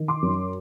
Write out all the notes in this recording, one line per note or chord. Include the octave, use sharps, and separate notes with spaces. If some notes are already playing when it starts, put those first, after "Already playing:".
Already playing: D#3
C6 D6
F#2